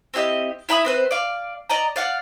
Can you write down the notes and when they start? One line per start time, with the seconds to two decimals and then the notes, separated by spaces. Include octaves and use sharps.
0.14 C4 E4 G4 D#5
0.69 E4 E5 B5 D#6
0.85 C4 B4 C5
1.11 D5 F5
1.70 D5 D#5 A#5
1.96 D5 F5 F#5